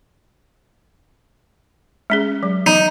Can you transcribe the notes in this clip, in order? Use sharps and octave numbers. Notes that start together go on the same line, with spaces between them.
G#3 C#4 G#4
F#3
D#4